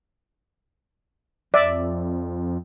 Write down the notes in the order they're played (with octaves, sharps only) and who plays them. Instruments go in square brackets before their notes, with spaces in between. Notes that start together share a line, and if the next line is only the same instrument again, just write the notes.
[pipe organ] F2 [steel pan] D5 E5